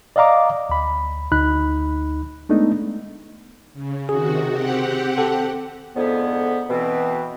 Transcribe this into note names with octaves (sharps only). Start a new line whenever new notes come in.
D5 D#5 F5 A#5 D6
D2 B5
D2 D#4 B5 F#6
G#3 A3 B3 D4 D#4
C#3
C3 D#3 F#4 G#4
C4 G4 F#5
A4
F2 G#2 D3 B3
B2 E3 C4